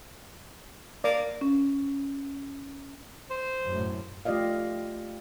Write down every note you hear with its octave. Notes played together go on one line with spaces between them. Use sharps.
A#3 D5
C#4
C5
F#2 A2
A3 F4 G4 D5 D#5 F5